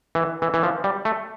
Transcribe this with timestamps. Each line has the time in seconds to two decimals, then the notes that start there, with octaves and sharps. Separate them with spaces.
0.15 E3
0.42 E3
0.54 E3
0.63 F3
0.84 G3
1.05 A3